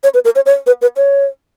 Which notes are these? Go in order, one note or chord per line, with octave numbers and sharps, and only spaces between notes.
C#5
B4
A#4
C#5
C#5
B4
B4
C#5